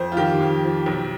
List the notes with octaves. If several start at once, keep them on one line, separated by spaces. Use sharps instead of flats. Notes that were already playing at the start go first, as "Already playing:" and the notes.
Already playing: F2 C5
F4
D#3 G4
F2
F3
B1